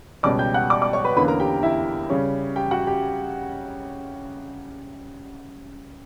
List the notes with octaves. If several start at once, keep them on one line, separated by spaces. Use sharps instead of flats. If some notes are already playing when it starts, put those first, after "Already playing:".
C#2 B2 G3 C#4 D5 D6
G5 G6
F#5 F#6
D5 D6
D5 D6
C#5 C#6
B4 B5
E2 D3 A#3 C#4 B4 B5
A#4 A#5
G4 G5
E4 E5
C#3 G3 C#4
G4 G5
F#4 F#5
G4 G5